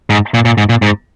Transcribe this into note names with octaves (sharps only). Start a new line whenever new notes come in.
G#2
A#2
A#2
G#2
A#2
G#2